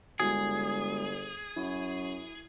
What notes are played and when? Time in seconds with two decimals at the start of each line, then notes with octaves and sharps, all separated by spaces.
0.20 G1 G#3 E4 F#4 G#4
1.56 F#2 E4